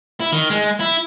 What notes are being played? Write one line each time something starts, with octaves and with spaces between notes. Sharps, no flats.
E4
D#3
G#3
E4